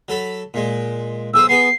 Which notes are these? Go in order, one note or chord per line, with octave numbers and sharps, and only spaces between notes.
F#3 A4 B5
A#2 G#3
B1 G#4 C5 E6
B3 G#4 B4 C7